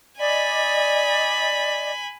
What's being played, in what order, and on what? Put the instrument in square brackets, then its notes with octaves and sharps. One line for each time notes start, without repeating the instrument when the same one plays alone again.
[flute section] D5 D#5 [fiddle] G#5 B5